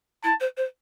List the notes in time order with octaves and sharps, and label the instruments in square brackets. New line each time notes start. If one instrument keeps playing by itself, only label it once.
[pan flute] E4 [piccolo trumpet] A5
[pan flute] C5
C5